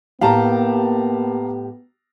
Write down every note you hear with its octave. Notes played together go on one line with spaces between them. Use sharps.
A2 A#3 B3 G4 F5 A5 A#5